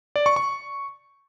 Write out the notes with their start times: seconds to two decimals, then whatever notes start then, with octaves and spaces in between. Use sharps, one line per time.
0.16 D5
0.26 C#6
0.36 C#6